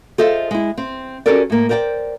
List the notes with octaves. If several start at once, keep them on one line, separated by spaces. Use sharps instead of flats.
F4 G#4 A4 C5 D#5 E5
G#3 E4
C4
C#4 F#4 G4 A4 A#4 D5
A2 A#3
A#4 C5 D5 F#5 G5